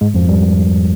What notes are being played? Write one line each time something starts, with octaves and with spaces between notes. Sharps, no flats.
G#2 G#3
F2 F3
G3